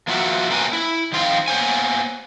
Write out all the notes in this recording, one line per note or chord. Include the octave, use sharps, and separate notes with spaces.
F3 A#3 F4 F#4 E5
A3 A#3 C4 C#4 B4 G#5
E4
D#3 F3 C4 F4 F5
A#3 B3 C5 C#5 G#5